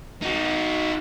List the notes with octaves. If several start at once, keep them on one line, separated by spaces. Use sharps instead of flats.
D#4 F#4